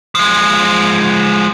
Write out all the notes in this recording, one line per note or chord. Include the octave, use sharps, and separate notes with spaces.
F3 G#3